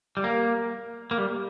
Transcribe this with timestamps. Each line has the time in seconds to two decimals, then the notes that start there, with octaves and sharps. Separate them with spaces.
0.17 G3
0.24 A#3
1.11 A#3
1.18 G3